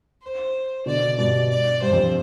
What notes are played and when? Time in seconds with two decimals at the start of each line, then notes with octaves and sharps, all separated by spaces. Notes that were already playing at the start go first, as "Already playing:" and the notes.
0.22 C5
0.86 B2 D3 D5
1.18 G2 B2 D5
1.49 D5
1.82 G2 C5
1.93 F2